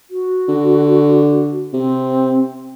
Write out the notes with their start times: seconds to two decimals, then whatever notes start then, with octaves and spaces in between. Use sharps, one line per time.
0.10 F#4
0.48 D3
1.74 C3 C4